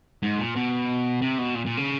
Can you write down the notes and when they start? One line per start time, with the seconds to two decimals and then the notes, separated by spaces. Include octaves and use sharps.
0.23 G#2
0.39 A#2
0.56 B2
1.22 C3
1.38 B2
1.55 A#2
1.66 A#2
1.77 C#3